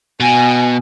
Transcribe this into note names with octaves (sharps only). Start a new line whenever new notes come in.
B2 G#5